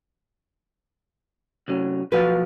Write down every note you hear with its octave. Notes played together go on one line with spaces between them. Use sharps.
C3 F#3 C#4
B1 F3 F#4 B4 F5